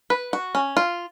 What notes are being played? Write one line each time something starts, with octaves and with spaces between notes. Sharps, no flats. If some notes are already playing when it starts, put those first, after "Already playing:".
B4
F#4
C#4
F4